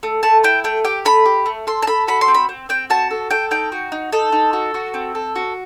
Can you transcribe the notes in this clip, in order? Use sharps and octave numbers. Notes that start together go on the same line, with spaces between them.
A3
A3 A5
E4 G5
A3 G5
G4 G5
A3 B5
G4
A3
A4 C6
A5
A4 B5
F#4 B5
C6
C4
B5
C4
C4 G5
F#4 A5
A4
A4 G5
D#4 G5
F#4
D#4
D#4 A4
D#4
F#4
F#4
C4
A4
F#4